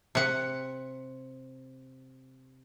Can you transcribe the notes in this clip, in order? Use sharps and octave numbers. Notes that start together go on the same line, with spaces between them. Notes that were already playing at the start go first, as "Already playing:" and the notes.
C3 F#5